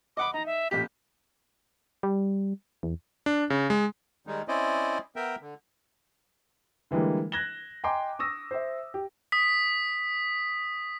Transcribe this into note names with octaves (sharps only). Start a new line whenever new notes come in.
D#5 F#5 B5 D6
D#4 A#5
E5
A1 A#2 G4 B6
G3
E2
D4
C#3
G#3
D#3 G3 G#3 D#4
C4 C#4 E4 C5 D5 D#5
B3 A#4 E5 G5
D3
D3 E3 G3 G#3 A#3
F#6 G#6 A#6 E7 G7
D#5 G5 G#5 A#5 C6 D6
C#6 D#6 E6 A#6
C5 E5
G4
D#6 B6